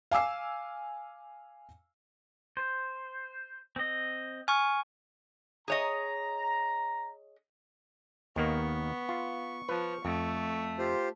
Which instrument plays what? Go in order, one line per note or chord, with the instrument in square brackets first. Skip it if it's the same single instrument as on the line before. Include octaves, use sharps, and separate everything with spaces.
[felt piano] F5 G#5 D6 E6 C7
[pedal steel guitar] C5
C4 D#5
[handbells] G#5 C#6 [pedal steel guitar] F6
[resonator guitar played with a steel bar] G#4 C#5 D#5 [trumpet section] A#5
[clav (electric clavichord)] D#2 D#3 A#3 [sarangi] B3 [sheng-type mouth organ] C#6
[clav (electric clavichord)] F4
[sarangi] F3 [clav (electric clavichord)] B4
[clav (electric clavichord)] F2 [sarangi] A3
[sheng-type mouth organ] F4 G4 C5